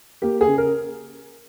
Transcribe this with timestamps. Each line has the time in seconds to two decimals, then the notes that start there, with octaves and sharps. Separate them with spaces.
0.22 A#3 G4
0.41 G#4
0.47 C#3
0.58 A#4